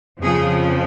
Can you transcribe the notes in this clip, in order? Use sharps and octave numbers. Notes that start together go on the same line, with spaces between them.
F2 C#3 F3 G#4